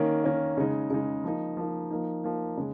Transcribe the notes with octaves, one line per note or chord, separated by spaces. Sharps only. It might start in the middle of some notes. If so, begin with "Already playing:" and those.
Already playing: D#3 A#3 C#4
D#3 A#3 C#4
C#3 G#3 D#4
C#3 G#3 D#4
F3 A#3 D#4
F3 A#3 D#4
F3 A#3 D#4
F3 A#3 D#4
C#3 G#3